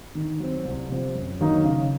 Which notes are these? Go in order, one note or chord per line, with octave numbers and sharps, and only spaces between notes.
D#3
F#3 C4
C2
C3 F3 C4
F#2
D#3 F#3 A#3 D#4
C#3